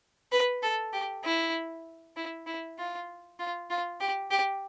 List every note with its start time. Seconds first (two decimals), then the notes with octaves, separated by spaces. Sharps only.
0.32 B4
0.63 A4
0.93 G4
1.24 E4
2.16 E4
2.47 E4
2.78 F4
3.39 F4
3.70 F4
4.01 G4
4.31 G4